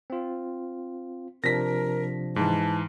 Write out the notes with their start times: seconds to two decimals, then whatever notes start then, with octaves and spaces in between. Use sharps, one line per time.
0.10 C4 F4
1.44 C3 F3 D4 A#4 A#6 B6
2.36 G#2 E3 A5